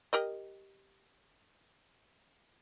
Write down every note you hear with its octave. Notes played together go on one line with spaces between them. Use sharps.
G4 A#4 D#5